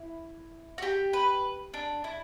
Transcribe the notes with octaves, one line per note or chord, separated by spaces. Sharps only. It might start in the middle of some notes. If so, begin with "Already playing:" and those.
Already playing: E4
F#4
G4
B4
D4
E4